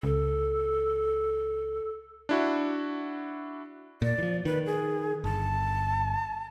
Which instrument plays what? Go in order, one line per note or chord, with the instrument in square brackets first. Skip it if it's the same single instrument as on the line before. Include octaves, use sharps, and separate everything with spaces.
[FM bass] C#2 [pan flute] A4
[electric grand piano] D4 E4 F#4
[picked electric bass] A#2 [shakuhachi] D5
[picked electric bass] E3 F3
[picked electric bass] D#3 [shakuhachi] B4
[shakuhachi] G#4
[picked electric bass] G1 [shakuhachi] A5